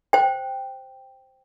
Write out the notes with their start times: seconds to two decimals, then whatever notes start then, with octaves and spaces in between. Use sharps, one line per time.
0.13 C5 G5